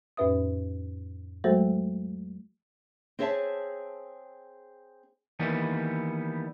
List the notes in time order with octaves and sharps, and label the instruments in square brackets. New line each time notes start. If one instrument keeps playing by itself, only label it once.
[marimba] F2 A2 C#4 B4 E5 D#6
F#3 G#3 A3 F#4 A4 C5
[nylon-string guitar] C4 E4 G#4 C#5 E5 A5
[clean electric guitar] D#3 E3 G3 A#3 B3